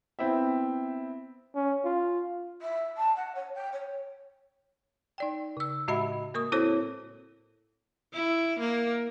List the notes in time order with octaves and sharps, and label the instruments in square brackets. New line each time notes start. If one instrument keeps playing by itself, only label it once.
[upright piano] B3 C4 E4 E5
[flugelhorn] C#4
F4
[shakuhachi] E5
A5
F#5
C#5
G5
C#5
[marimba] D#4 D5 G5
C#3 E6
A2 G#3 F#4 D#5 E5 B5
A#3 A#4 C#6 D#6
C4 E4 F#4 A4 C5 C#5
[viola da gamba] E4
A#3